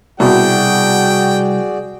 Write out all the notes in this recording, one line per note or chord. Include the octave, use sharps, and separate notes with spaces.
C2 B2 F#4 G#4 D5 G5